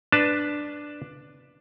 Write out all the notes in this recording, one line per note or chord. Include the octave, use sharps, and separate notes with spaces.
D4 B4 A5